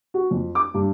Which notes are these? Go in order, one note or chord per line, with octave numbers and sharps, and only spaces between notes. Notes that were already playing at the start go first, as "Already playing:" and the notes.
F#4
F2
D6
G2